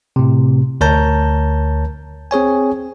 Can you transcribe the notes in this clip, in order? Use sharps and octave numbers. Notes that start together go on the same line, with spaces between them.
A2 C3
D2 A#4 C#5 A5 A#5 G6
C4 G#4 C#5 G#5